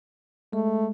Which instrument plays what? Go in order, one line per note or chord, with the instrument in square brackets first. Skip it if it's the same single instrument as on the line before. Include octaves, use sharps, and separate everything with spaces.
[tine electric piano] G#3 [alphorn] A3